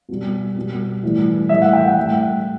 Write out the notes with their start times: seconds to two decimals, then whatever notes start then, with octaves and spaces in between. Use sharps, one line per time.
0.09 B2 G3
0.56 B2 G3
1.03 A2 E3 G3
1.49 A2 E3 G3 E5
1.62 F#5
1.73 G5
1.85 F#5
1.97 A2 G3